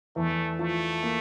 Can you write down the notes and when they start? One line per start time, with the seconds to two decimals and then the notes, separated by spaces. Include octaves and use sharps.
0.16 E2 A3
0.59 F3 A3
1.03 A#3